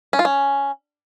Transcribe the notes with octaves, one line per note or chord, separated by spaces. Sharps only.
C#4
F4
C#4